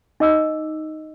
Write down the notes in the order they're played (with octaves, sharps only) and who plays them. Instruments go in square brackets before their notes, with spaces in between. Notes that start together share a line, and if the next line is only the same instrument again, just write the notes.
[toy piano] D#4 D#5 D6 E6